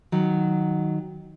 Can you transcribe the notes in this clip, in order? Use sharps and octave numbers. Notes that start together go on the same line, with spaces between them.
D#3 F#3